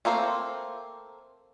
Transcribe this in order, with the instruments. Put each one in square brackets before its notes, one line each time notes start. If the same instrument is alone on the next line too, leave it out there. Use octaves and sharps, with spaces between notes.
[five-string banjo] A3 A#3 C4 C5